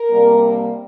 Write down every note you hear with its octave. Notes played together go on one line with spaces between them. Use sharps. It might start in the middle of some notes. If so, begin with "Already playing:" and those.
Already playing: A#4
C3 G3 A#3 D4